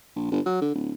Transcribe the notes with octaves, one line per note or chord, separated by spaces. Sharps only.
A#1
G1
F#3
D3
D1